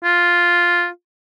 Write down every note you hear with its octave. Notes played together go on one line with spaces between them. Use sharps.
F4